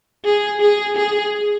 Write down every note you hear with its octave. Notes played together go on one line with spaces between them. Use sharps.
G#4
G#4
G#4